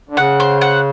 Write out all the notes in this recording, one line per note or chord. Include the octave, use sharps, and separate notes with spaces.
D3
C#3 F#5
C5
F#5